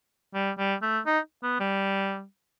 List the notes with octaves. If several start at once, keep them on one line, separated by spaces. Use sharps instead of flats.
G3
G3
A3
D#4
B3
G3